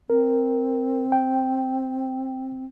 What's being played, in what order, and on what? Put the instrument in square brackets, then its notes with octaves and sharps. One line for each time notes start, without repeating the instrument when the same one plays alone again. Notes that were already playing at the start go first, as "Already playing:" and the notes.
[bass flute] C4 [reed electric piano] A#4
[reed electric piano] G5